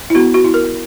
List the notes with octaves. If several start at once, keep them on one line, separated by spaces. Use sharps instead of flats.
E4
B3 F#4
F#4
E4
A#4